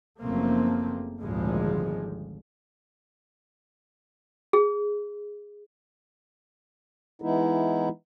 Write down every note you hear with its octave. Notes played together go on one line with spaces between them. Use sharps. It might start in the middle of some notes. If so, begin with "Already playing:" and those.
F#1 F3 A3 A#3 C4
G#1 D2 A#2 F3 G3 G#3
G#4
E3 G#3 B3 D#4 E4